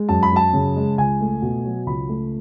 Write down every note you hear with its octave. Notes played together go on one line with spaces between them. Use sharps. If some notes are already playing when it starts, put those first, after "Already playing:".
Already playing: G#3
F#2 A5
B5
F#2 A5
C#3
G#3
C#2 G#5
A3
B2
F#3
C#2 B5
A3